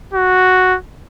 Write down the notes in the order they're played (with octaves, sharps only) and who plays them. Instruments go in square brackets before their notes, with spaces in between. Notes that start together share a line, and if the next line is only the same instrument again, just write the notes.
[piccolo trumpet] F#4